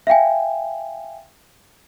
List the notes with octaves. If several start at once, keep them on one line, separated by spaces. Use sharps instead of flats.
E5 F5 G5 G#5